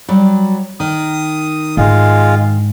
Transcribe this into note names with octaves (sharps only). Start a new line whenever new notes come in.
F#3 G3
D#3 D#6
G#2 G#3 F4